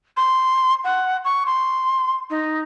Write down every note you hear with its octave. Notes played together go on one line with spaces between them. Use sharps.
C6
F#5
C#6
C6
D#4